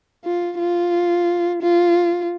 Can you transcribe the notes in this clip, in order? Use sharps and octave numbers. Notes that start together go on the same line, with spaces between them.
F4
F4
F4